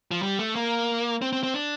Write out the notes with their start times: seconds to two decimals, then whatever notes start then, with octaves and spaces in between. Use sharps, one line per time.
0.11 F3
0.23 G3
0.39 A3
0.55 A#3
1.22 C4
1.33 C4
1.43 C4
1.54 D4